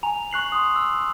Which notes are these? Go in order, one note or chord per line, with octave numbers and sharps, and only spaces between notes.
G#5 A#5 F7
C#6 F#6 C7 F#7
C6 D#6
E6